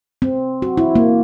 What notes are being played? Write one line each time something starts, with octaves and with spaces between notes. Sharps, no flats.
C4
F#4
E4
A#3